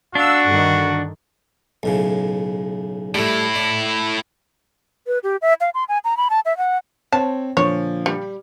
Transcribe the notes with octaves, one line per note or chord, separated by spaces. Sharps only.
D4 F#4 F5 E6
G2 D3 D#3
B1 A2 C#3
A2 G3 A3 E4
D5
B4
G4
E5
F5
C6
G#5
A#5
B5
A5
E5
F#5
C4 C5 C#5 A5
A#2 D3 F3 C#5
G3